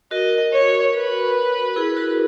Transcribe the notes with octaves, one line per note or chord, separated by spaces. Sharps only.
F#4 A#4 D#5
C#5
B4
E4 G#4
F#4 A#4